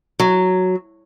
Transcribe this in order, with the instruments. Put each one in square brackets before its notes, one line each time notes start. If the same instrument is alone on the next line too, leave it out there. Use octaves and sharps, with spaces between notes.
[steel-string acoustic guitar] F#3